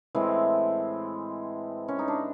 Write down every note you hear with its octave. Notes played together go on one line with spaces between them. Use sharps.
A2 E3 G#3 C4
C#4
D#4
D4